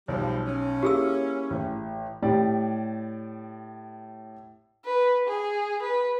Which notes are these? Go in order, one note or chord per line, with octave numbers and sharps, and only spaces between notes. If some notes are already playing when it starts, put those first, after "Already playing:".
B1 F3 G3
C#4
A#3 E4 G4 G#4 E6
A1
A2 G4 D5
B4
G#4
B4